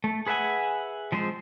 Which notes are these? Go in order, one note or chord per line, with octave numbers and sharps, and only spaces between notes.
A3
G#4 B4 E5 F#5 G#5
F3 G#3 C4 C5